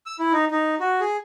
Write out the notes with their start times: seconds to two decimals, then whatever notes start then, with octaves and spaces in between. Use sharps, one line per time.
0.06 E6
0.19 E4
0.33 D#4
0.51 D#4
0.80 F#4
1.00 G#4